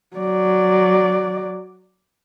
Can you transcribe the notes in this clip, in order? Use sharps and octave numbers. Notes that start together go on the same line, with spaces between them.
F#3 D5